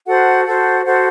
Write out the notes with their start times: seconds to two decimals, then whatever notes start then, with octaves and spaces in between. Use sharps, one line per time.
0.05 F#4 A4 C5 F#5
0.45 F#4 A4 C5 F#5
0.85 F#4 A4 C5 F#5